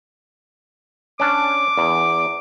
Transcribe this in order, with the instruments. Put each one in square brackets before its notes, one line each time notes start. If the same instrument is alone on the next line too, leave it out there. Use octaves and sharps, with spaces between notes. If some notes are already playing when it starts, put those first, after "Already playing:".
[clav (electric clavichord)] C#4 D4 [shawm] D6
[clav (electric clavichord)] E2